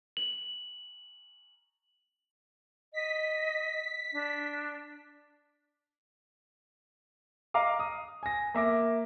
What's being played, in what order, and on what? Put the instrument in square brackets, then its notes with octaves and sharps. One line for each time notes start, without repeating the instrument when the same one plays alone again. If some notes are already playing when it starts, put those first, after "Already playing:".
[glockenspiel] F#7
[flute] D#5 [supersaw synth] B6
[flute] D4
[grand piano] D#5 F5 A#5 D6
D#6
G#5 A#6
A#3 E5 D6 A#6